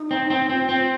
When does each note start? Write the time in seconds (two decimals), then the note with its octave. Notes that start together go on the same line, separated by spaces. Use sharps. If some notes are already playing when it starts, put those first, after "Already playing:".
Already playing: D#4
0.11 C4
0.30 C4
0.50 C4 F4
0.69 C4